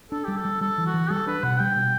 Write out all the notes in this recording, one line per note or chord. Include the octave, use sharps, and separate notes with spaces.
D4 A4
G3 G4
A4
G3
G3 A4
E3
F#4
E3
G3 A4
D4 B4
B2 F#5
G3 G5
B2